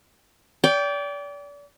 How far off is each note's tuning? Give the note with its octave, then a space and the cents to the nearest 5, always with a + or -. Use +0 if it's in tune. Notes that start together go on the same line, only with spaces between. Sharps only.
D5 -35 G5 +0